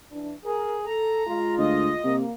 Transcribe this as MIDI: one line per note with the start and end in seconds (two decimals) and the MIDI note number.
0.11 0.33 52
0.11 0.33 62
0.45 0.85 68
0.45 0.76 70
0.86 1.25 69
0.86 1.55 82
1.27 1.98 56
1.27 1.98 65
1.58 1.91 38
1.58 2.16 75
2.04 2.23 48
2.04 2.32 58